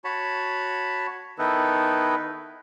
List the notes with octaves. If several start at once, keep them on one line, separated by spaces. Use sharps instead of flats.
F#4 C#5 A5 B5
D#3 B3 D#4 E4 A4 B4